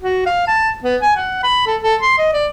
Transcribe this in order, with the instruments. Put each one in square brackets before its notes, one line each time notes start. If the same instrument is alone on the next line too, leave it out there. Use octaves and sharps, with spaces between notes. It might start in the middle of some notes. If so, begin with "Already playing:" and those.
[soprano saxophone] F#4
F5
A5
B3
G#5
F#5
B5
A4
A4
C6
D#5
D5